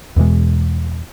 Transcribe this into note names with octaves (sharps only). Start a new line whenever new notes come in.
E2 B2 E3 G#3